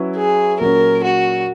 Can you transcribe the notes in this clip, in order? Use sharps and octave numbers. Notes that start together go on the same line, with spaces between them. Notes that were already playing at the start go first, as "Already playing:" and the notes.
Already playing: F#3 C#4 E4 B4 E5
G#4
A#2 F#3 C#4 A#4
F#4